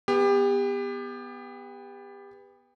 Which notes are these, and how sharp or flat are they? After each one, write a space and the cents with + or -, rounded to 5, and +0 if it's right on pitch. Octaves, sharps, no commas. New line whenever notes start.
B3 +0 G4 +30